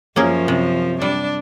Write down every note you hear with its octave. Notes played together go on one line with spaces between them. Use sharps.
F#2 F3 A#3 C#4 G#4
C3
G3 D4